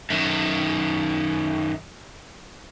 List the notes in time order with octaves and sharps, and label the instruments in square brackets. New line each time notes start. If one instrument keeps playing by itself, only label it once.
[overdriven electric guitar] F#2 D#3